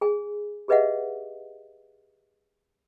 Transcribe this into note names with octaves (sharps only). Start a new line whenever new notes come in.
G#4 G#5
G4 G#4 B4 D#5 E5 F#5